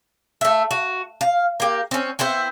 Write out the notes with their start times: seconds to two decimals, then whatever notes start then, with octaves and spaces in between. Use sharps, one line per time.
0.41 A3 E5
0.71 F#4
1.21 F5
1.60 A#3 G4
1.91 C4 C#4
2.19 B3 C4 E4 C5